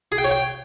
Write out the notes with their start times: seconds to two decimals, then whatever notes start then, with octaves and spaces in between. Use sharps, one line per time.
0.12 G#4
0.18 G5
0.24 C#5
0.31 G5